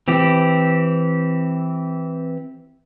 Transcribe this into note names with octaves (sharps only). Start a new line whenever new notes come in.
E3 C4 G4